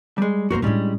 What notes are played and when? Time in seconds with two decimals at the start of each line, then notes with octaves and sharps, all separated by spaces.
0.18 G3 G#3
0.51 F#1 A#3 F#4 A#4 C5
0.62 A2 G3 G#3 C#4 D4